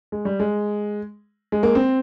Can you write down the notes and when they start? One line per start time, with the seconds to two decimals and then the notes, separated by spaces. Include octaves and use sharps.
0.12 G#3
0.25 G3
0.40 G#3
1.52 G#3
1.63 A#3
1.75 C4